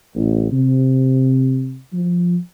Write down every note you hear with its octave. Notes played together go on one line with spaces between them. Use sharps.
A1
C3
F3